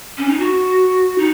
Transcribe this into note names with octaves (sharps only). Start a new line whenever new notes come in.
C#4
D#4
F#4
D#4